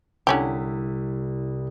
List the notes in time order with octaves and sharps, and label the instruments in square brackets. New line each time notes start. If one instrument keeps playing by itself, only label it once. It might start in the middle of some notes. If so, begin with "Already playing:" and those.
[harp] C2 E4 [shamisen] D3 C#4 G4